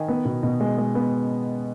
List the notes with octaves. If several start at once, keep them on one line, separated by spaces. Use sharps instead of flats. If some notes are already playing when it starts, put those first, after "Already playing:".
Already playing: D#3 D#5 G#5
B3
B2
B2
G#3
G#3
B3